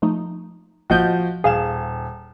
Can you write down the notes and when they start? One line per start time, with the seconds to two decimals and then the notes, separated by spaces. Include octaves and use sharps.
0.02 F3 A3 D#4
0.90 A1 F3 F#4 D#5 G6
1.44 D#1 G#4 F5 E7